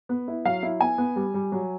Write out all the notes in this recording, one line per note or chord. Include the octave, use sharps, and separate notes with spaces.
B3
E4
F#3 F5
E4
B3 G#5
B3
G3
G3
F#3